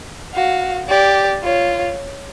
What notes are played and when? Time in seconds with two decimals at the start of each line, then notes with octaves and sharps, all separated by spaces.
0.34 F#4 F5
0.89 G4 D5
1.43 F4 C#5